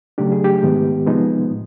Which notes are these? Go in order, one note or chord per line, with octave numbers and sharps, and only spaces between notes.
C#3 F#3 A3 D4 G4
G#4
G4
G#2 D#3 G#3 B3
C3 F3 G#3 B3 D#4
A2